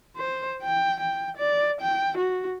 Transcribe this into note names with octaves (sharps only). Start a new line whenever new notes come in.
C5
G5
G5
D5
G5
F#4